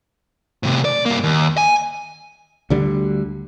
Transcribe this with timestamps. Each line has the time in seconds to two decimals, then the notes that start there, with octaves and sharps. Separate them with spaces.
0.63 A2 C3
0.85 D5
1.06 G2 A#3
1.24 D#2
1.57 G#5
2.70 D2 D3 G3